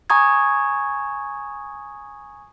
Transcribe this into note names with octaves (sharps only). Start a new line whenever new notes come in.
G#5 A#5 C#6 D#6 G#6